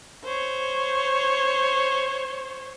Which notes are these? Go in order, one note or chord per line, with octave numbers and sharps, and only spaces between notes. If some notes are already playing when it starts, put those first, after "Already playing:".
C5 C#5